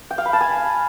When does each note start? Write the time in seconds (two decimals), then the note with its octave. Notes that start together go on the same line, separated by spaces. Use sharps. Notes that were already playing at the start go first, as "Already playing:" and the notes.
0.11 G5
0.18 F5
0.26 B5
0.33 A5
0.41 G#5